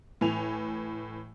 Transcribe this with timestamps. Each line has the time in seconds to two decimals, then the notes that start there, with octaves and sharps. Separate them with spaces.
0.21 A2 E3 G#5 F7